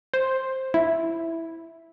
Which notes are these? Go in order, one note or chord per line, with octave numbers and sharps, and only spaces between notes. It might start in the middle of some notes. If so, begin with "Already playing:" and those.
C5
E4